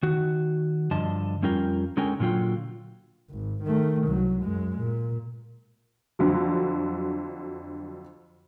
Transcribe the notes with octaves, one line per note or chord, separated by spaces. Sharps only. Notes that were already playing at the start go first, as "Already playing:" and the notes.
D#3 F#4
G2 D3 F3 D#5 A5
F2 G3 C#4 F4 A#4 G5
D3 G#3 C#4 A#4 G5 G#5
A#2 D3 F#3 F4 G5
G#1
D#3 A3
C2 F#3
F#2 G#3
A#2
F2 D3 F#3